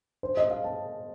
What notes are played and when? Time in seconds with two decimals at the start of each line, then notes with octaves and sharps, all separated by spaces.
0.23 C5
0.37 D#5
0.50 F5
0.64 A5